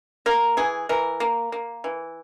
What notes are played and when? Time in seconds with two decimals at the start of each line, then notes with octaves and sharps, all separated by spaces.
0.26 A#3 A#4
0.57 E3 G#4
0.89 E3 A#4
1.20 A#3
1.52 A#3
1.84 E3